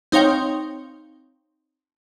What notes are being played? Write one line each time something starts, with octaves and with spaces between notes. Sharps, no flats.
C4 D#4 C#5 F5 G5